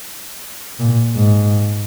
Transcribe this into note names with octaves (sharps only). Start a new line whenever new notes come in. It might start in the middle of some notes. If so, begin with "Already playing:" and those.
A#2
G#2